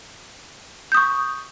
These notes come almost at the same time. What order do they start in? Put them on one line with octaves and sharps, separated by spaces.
G6 D#6 C#6